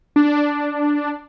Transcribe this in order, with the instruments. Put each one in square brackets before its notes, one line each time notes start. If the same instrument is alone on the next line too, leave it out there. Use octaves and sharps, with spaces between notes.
[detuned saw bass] D4